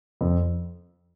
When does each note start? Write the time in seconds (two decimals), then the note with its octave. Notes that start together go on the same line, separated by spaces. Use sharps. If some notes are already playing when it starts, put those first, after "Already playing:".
0.21 F2